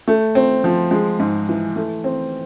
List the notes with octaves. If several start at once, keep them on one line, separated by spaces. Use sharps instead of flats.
A3
C4
F3
G#3
G#2
E3
A3
C4